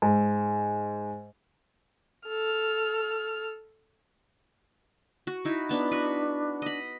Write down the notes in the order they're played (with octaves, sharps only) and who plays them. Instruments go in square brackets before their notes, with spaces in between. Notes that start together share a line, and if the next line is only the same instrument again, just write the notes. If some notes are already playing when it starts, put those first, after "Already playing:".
[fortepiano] G#2
[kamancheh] A4 F6
[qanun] F#4
D#4 E4
[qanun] B3 A5 [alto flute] D4
[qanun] F#4 B4
D#5 B5